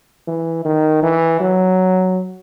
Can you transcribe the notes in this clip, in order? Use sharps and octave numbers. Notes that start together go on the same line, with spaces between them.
E3
D#3
E3
F#3